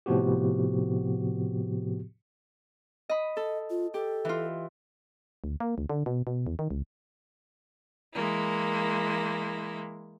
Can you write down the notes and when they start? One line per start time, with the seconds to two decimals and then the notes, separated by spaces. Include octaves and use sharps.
0.06 A2 C3 F3 B3 F#4 G4
3.09 D#5 B5
3.37 A4 D#5
3.70 F4
3.94 G4 A4
4.25 E3 F4
5.44 D2
5.60 A#3
5.78 D2
5.90 D3
6.06 B2
6.27 B2
6.47 E2
6.59 D#3
6.71 C#2
8.13 E3 G#3 A#3 E4